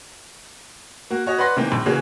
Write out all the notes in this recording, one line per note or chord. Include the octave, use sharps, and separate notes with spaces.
A#3 F#4
F#4 C#5 D#5
B4 D5 F#5 C6 A#6
C3 D#3 E3 A#3 C4
A#1
C#3 E3 A#3 F#4 G#4 C#5